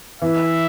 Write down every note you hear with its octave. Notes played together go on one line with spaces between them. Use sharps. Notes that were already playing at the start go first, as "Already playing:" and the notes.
E3 E5